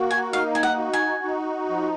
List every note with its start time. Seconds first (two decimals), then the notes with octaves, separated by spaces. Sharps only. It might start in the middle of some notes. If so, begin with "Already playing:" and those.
Already playing: A#3 F#4
0.11 G#5
0.32 D#4 F5
0.55 G#5
0.63 F#5
0.78 F#4
0.93 G#5
1.24 D#4
1.69 F3